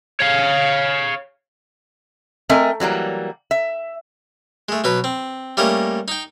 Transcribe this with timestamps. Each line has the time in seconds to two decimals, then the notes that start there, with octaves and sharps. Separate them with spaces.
0.20 C#5 F5
2.49 A3 C4 A#4 D#5 E5 G#5
2.80 E3 F#3 G3 A#3
3.51 E5
4.69 G#3 A3
4.84 B2 F#3 B4
5.04 C4
5.57 G3 A3 A#3 C#4 D#5
6.08 D#4 G5